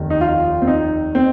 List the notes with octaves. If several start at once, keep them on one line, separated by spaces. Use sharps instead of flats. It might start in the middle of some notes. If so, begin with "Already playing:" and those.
Already playing: F1 D#2 D#3
D#4
F4
C4
D#4
C4